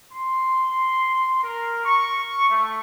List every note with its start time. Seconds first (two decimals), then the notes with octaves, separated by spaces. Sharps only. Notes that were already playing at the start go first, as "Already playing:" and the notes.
0.13 C6
1.42 A#4
1.86 C#6
2.50 A3